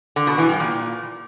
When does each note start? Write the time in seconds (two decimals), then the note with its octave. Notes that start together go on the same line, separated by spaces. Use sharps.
0.16 D3
0.27 B2
0.38 E3
0.49 G2
0.60 A#2